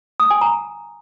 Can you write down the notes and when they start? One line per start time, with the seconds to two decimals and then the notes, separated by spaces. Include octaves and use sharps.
0.20 D#6
0.30 G#5
0.41 A#5